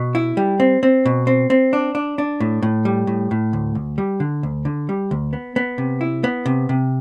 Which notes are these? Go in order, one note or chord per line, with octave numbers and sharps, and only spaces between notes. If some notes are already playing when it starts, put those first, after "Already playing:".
Already playing: B2
E4
G3
C4
C4
B2
C4
C4
D4
D4
D4
A2
A2
G3
A2
A2
D2
D2
G3
D3
D2
D3
G3
D2
B3
B3
C3
E4
B3
C3
C3